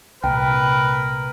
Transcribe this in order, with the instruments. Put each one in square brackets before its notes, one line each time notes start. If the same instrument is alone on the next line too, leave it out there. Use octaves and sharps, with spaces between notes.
[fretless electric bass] C2 A#2 [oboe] A#4 [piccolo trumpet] B4 [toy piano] G5